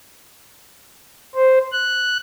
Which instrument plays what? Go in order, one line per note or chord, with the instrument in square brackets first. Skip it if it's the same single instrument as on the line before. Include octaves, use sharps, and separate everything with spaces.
[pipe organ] C5
F#6